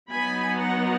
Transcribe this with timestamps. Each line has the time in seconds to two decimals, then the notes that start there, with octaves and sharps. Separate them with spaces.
0.10 F#3 B3 D#4 G#5 B5
0.58 F#5 A#5